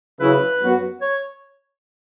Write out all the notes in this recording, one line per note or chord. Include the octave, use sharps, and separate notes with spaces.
C#3 F#3 C#4 E4 B4
F#2 F#3 B3 F#4
C#5